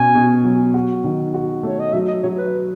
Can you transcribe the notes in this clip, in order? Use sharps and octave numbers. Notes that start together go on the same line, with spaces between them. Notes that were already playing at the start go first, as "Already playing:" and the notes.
Already playing: B2 C#4 G#5
B2
F#3
F#4
D#3
F#4
A3 C#5
D#5
F#3 E5
D#5
F#3 C#5
B4